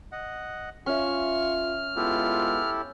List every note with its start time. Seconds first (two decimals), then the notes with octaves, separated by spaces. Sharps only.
0.12 D#5 F#5
0.86 C#4 F4 E5 C#6 F6
1.96 G#3 B3 E4 F4 G4 A4